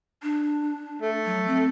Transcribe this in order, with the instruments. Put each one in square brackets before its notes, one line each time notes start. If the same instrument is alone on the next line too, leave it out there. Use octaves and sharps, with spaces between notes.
[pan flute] D4
[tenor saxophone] A3
[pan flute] F#3
C4